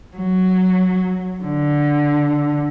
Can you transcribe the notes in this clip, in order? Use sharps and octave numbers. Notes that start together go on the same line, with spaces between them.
F#3
D3